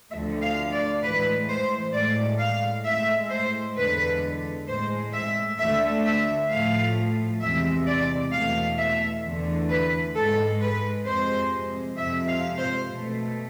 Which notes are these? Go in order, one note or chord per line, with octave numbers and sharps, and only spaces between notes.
D2 D3 F3 A3 E5
F5
D5
A2 E3 G#3 B4
C5
A2 G#3 D5
F5
A2 G#3 E5
C5
E2 D3 G#3 B4
A2 G#3 C5
E5
D2 D3 A3 E5
E5
A2 F3 A3 F5
E2 C3 E3 G#3 E5
D5
E2 B2 A3 F5
E5
E2 D3 A3
B4
G#2 G#3 A4
B4
F2 C3 G#3 C5
F2 C3 F3 G#3 E5
F5
C5
B2
A3